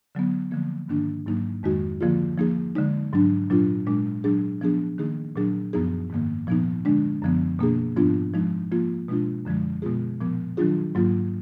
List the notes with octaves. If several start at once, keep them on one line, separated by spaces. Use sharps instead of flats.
D3 F#3 B3
D3 F3 A#3
G#2 D#3 A#3 D4
G#2 F#3 A#3 D#4
F2 D#3 G#3 D#4 F#4
D3 F3 A#3 F4 G#4
F3 A#3 D#4 G#4
D3 G#3 D#4
G#2 F#3 D4
A#2 F#3 D4 F4
A#2 G#3 D4
A#2 F#3 D4 G#4
F3 B3 D4 G#4
D#3 A#3 D#4 G#4
A#2 F#3 D4 G#4
F#2 F3 B3 D#4 G#4
G#2 D#3 A#3
A#2 F3 B3 D#4
D3 G#3 D4
F#2 D3 F3 B3
B2 A#3 D4 G#4
G#2 F3 B3 D4 F4
F3 G#3 D#4
F3 A#3 F4
B2 G#3 D4 F4
F#2 D3 F3 G#3
B2 G#3 B3 F4 G#4
A#2 F3 B3
D#3 F#3 D4 F4 G#4
G#2 F#3 A#3 F4